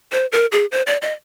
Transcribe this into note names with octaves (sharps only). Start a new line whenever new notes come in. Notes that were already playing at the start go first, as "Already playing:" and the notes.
C5
A#4
G#4
C5
D5
D#5